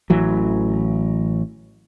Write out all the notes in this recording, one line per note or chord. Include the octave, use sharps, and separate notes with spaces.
A1 E3 F#3